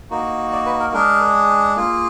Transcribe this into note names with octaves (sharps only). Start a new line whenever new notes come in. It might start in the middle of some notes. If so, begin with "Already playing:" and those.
A#3 D#4 F#4
D5
B4
A#4
G#3 D4 G#4 A#4
A#3 F4 G#4